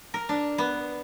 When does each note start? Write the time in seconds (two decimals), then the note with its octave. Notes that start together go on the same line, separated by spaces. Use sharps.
0.14 A#4
0.29 D4
0.58 B3